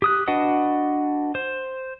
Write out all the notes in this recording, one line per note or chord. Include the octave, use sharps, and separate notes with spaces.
G4 D#6 F#6
D4 F#4 B4 D#5 F#5
C5